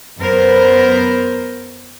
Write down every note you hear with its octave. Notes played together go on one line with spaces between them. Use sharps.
F#2 B3 A#4 C5